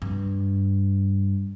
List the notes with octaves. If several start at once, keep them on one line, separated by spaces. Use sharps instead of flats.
G2